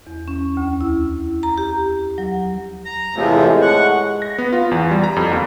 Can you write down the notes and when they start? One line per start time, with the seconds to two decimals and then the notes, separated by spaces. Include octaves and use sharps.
0.07 E2
0.28 C#4
0.57 D2
0.81 E4
1.43 A#5
1.58 G4
2.18 F#3
2.85 A#5
3.16 E2 A2 C3 F3 G#3
3.62 F#5 C#6
4.22 A#6
4.38 B3
4.53 F4
4.71 E2
4.91 G3
5.04 A#5
5.16 F2
5.32 D#2